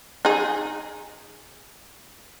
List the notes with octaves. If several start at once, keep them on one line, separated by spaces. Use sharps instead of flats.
D#4 G#4